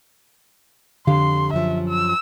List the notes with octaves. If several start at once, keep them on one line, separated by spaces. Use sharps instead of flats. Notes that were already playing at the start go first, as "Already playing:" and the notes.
F2 D3 G4 F5 C6
F#2 F3 E5
E6